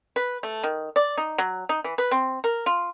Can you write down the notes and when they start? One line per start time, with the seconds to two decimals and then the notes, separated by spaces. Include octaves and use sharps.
0.16 B4
0.43 A3
0.63 D#3
0.96 D5
1.17 D#4
1.38 F#3
1.69 D#4
1.84 E3
1.98 B4
2.11 C4
2.44 A#4
2.66 F4